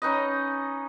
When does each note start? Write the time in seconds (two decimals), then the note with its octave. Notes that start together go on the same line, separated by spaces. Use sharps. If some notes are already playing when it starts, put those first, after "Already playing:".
0.02 C#4 D#4 B4 D#5